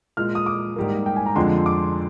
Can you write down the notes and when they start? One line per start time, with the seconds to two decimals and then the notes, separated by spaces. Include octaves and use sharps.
0.17 A#2 G#3 F6
0.35 D#6
0.46 D6
0.76 G#2 G3 A#3
1.06 G5
1.16 G#5
1.26 A#5
1.35 F2 D3 F3 G#3 C6
1.66 D6